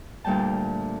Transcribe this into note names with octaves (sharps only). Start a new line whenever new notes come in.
D2 A#2 G3 G5 A5